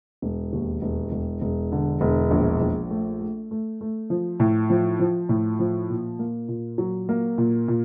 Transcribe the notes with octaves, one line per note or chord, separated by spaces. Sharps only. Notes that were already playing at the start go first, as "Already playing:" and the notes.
E1
D#2
E1
E1
E1
D3
E1
A#1
A#1
A3
A3
A3
A3
F3
A2
F3
F3
A2
F3
A#2
A#3
A#2
F#3
A#3
A#2
A#2